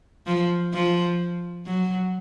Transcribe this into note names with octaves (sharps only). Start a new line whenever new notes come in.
F3
F3
F#3